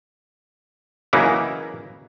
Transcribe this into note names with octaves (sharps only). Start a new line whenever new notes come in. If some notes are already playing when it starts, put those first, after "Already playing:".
C#3 E3 F#3 A#3 D#4 E4